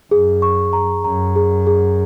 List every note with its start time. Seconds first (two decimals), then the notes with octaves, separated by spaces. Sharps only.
0.11 F#2 G#4
0.42 C#6
0.73 A#5
1.04 F#2 A#5
1.36 G#4
1.67 G#4